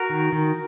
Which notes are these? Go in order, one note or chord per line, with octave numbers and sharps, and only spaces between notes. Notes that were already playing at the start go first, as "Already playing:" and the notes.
Already playing: F#4 A#4
D#3
D#3